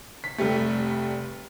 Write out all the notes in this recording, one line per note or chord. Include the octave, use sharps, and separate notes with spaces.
B6
F1 G3 A3